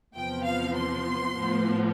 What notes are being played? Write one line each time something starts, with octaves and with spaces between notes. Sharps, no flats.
E2 C3 F3 B3 G5
F5
C6
A2 F3 B3